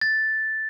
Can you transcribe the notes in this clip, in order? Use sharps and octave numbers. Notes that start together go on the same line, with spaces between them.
A6